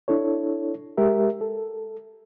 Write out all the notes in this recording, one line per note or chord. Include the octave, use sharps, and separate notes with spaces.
D4 E4 A4 C#5
G#3 G4 A#4 E5
A4